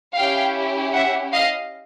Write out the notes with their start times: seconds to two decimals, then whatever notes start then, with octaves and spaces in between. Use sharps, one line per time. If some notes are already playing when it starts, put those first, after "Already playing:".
0.18 C#4 E4 G4 F5 G5
0.95 E5 F#5
1.33 D#5 F5